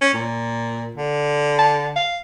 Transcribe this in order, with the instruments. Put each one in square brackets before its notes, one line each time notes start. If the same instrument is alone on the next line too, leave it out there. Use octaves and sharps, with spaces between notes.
[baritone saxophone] C#4
A#2
D3
[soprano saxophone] A5
F5